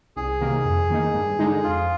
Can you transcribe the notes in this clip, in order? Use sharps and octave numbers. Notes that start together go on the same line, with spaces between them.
C2 G#4
C3 D#3 A#3
F2
D#3 A#3 D#4
G2
D3 G#3 D#4
F2 F4